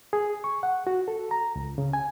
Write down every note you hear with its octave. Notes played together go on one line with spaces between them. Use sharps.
G#4
C#6
F#5
F#4
A4
A#5
C#2
C#3
G#5